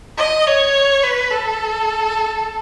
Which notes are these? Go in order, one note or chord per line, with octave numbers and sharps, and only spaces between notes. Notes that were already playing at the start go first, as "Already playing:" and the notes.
D#5
C#5
B4
A4